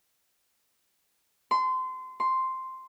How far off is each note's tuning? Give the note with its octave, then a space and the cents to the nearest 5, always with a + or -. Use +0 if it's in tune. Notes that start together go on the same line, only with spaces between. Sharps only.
C6 -25
C6 +0